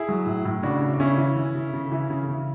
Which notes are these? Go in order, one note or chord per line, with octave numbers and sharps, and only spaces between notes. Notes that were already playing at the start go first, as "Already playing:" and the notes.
Already playing: E4 G#4
F#3
A2
A2
C#3 D4 F#4
C#3
D4
C#3 C#4 E4
E3
E3
C#3
C#3
E3
C#3
C#3